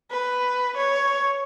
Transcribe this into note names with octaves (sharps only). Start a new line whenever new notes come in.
B4
C#5